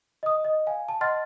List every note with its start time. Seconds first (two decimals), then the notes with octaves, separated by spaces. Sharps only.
0.23 D#5 D#6
0.44 D#5
0.67 F5 G#5
0.89 A5
1.01 D#5 F#5 C6 F6 A6